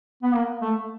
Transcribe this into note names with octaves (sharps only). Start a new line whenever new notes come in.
B3
A#3
A3